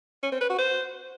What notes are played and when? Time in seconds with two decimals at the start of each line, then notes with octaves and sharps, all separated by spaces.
0.23 C#4
0.32 C4
0.41 B4
0.50 F#4
0.58 C5